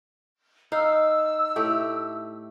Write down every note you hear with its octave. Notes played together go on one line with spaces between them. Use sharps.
D#4 F5 E6
A2 A3 G4